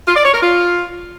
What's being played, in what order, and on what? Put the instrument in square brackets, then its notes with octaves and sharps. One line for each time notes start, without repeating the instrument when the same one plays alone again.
[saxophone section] F4
D5
C#5
A#4
F4